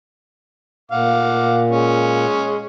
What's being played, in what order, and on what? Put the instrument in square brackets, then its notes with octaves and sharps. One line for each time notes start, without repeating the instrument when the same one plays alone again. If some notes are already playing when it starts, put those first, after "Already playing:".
[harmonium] A#2 [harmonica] F5 F#5 D6
[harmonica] G#3 C#4